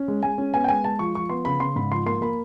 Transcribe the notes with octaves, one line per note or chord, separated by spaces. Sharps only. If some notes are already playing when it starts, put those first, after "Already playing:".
Already playing: C#4
G#3
G#3 G#5
C#4
B3 G#5
G5
G#3 G#5
G#3 A5
F3 C#6
F3 C#6
B3 C6
C#3 B5
C#3 C6
G#2 B5
F3 C6
A#3 C6
A#3 B5